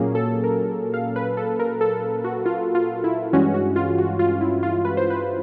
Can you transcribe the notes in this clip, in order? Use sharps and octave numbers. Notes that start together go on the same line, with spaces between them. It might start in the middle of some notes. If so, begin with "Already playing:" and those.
Already playing: A#2 F#3 A#3 C#4 G#4
A4
A#4
F5
B4
A4
A#4
A4
F#4
F4
F4
E4
G2 E3 G#3 C#4 F#4
F#4
F4
F#4
F4
E4
F4
B4
C5
B4